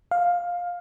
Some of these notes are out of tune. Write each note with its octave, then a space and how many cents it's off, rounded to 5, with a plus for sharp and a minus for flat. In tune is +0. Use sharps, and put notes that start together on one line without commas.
F5 +15